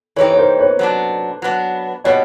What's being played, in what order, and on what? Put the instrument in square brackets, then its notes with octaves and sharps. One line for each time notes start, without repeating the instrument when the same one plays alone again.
[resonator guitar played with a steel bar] E3 G3 C4 D#4 G4 [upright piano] B4 C#5
[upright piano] C#5
A#4 C5
B4 C#5
[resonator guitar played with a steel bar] F#3 B3 D4
F#3 B3 D4
[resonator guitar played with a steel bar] B2 G3 B3 [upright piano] C#5 D#5